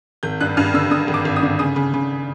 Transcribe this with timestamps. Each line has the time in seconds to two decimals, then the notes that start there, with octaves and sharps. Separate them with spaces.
0.23 G#1 G6
0.40 G2 F#6
0.57 G2 F6
0.74 D3 E6
0.91 D3 D#6
1.08 G#1
1.14 D6
1.25 G#1
1.36 D#6
1.43 D3
1.59 C#3 D#6
1.76 C#3
1.94 C#3